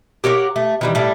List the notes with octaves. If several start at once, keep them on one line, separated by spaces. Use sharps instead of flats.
G4 A#4 C#5 F#5
A3
D#3 E3 G3
A2 G3 A3